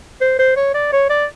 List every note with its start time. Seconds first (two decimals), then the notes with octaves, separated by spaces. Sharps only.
0.21 C5
0.39 C5
0.57 C#5
0.74 D5
0.92 C#5
1.10 D5